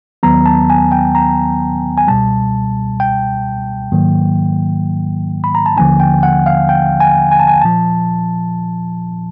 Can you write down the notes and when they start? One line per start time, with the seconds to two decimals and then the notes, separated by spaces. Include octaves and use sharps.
0.23 D#2 D#3 F#3 B3 A#5
0.46 A5
0.70 G#5
0.92 G5
1.15 A#5
1.98 G#5
2.08 C#2 B2 G3 A5
3.00 G5
3.92 G#2 D#3 F#3 A#3
5.44 B5
5.55 A#5
5.66 A5
5.76 D#2 D3 F3 A#3 C#4 G#5
6.00 G5
6.23 F#5
6.46 F5
6.69 G5
7.00 G#5
7.32 G#5
7.40 A5
7.48 G#5
7.62 A#2 F3 A5